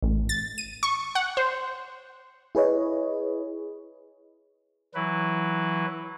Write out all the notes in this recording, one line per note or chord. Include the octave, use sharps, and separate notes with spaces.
A1
A6
D#7
C#6
F#5
C5
E4 G#4 B4 C#5 D#5
E3 F#3 E4 B4